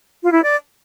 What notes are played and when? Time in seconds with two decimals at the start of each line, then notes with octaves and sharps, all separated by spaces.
0.23 F4
0.33 E4
0.43 D5